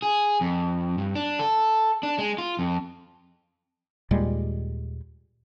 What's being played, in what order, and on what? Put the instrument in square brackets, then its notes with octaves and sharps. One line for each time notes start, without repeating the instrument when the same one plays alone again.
[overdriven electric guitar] G#4
F2
G2
D4
A4
D4
G#3
F4
F2
[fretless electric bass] D#2 A#2 G3 G#3